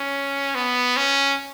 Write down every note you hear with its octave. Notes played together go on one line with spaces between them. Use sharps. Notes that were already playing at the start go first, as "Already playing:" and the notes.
Already playing: C#4
B3
C#4